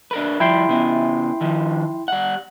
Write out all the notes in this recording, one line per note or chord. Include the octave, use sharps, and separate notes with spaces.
D4 A#4 B4
F3 G3 E4 G5 C6
C#3 B3
D#3 F3
G3 F#5